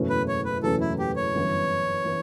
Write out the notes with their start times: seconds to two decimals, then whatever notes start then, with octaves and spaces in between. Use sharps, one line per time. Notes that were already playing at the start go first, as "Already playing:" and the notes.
Already playing: F#1 E2 B2 A3 C#4
0.10 B4
0.28 C#5
0.45 B4
0.63 F#1 E2 B2 A3 C#4 A4
0.81 E4
0.99 G4
1.16 C#5
1.34 G1 F#2 E3 B3
2.05 E3 B3